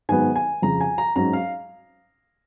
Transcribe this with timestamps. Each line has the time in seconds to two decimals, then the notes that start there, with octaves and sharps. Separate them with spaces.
0.09 G#2 D#3 F#3 B3 G#5
0.36 G#5
0.62 F2 C#3 F3 A#5
0.81 G#5
0.98 A#5
1.16 G#2 F#3 C#4 A#5
1.33 F5